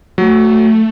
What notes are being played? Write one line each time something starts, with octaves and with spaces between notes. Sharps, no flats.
F#3 A3